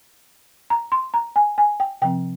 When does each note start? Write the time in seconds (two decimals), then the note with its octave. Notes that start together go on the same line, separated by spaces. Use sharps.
0.70 A#5
0.92 C6
1.14 A#5
1.36 G#5
1.58 G#5
1.80 G5
2.02 C3 F3 C4 G5